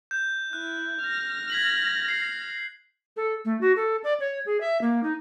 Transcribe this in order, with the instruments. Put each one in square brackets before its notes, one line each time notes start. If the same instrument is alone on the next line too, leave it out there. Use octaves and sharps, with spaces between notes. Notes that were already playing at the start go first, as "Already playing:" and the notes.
[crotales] G6
[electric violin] E4 [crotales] F#6
[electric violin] F6 A#6
[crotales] G#6 B6 F#7
C7
[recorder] A4
A3
F#4
A4
D5
C#5
G#4
E5
A#3
D#4